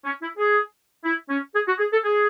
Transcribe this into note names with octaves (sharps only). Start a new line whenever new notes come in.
C#4
E4
G#4
E4
C#4
G#4
F#4
G#4
A4
G#4